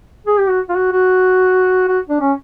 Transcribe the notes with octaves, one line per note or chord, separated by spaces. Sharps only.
G#4
G4
F#4
F4
F#4
F#4
F#4
D4
C#4